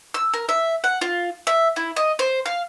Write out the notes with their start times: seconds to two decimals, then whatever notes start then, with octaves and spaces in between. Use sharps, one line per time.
0.14 E6
0.34 A#4
0.49 E5
0.84 F#5
1.01 F4
1.47 E5
1.76 E4
1.96 D#5
2.19 C5
2.46 F5